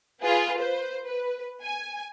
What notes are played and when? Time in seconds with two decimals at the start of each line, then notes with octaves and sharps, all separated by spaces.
0.21 F4 G#4 B4
0.57 B4 C5
1.03 B4
1.62 G#5